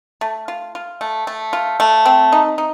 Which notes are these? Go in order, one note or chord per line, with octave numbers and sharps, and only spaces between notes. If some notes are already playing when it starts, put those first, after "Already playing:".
A3
F4
F4
A3
A3
F4
A3
C4
D#4
D#4